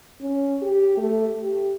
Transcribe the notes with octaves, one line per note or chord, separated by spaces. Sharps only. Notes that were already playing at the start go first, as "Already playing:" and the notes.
C#4
G4
A3
G4